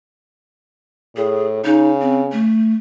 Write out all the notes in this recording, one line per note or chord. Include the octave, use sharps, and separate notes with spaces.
A2 G#4
C#3 D#4
C4
A3